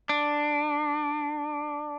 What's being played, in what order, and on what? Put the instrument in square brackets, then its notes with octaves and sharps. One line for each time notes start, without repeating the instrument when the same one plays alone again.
[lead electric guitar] D4